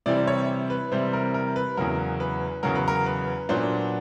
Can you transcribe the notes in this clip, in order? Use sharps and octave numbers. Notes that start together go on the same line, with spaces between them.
C3 E3 G3 C4 E4 D5
C#5
B4
C3 E3 G3 C4 E4 C5
A#4
A#4
B4
E2 C#3 F#3 A#4
B4
E2 C#3 F#3 A#4
B4
A#4
B4
A#2 F#3 B3 D4 C5